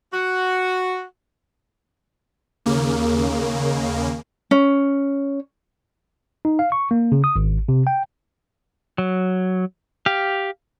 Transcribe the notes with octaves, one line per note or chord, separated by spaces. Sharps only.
F#4
D#2 C#3 A#3
C#4
D#4
F5
C#6
A#3
C#3
D#6
G#1
C3
G5
F#3
G4 F5